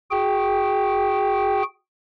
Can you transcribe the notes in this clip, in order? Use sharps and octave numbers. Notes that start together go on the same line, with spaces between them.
F#4 G#4 G5